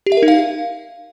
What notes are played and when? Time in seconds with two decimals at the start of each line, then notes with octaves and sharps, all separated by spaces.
0.06 G4
0.12 E5
0.17 A#4
0.23 D#4
0.28 F5